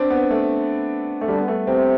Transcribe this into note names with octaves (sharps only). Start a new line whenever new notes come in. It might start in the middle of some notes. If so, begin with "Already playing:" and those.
Already playing: C4 D4
B3
A3
A3
D3 G3
B3
A3
C3 C4